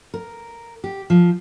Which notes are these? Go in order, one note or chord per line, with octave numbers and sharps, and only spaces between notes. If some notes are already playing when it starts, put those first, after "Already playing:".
A#4
G4
F3